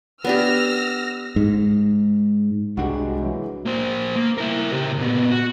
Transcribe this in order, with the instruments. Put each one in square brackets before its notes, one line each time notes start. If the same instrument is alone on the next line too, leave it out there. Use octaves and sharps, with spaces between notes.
[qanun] B3 D4 G4 [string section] E6 F6 A#6
[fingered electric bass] G#2
[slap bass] C2 D4 [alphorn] G#3 [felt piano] F#4 G4
[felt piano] E3 F#3
[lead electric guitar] A#3 C5
A#3
E4 A#4
C#3 G4
A#2 B3
F#4